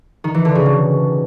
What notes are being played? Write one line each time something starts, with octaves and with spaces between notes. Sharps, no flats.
D#3
E3
D3
C#3
B2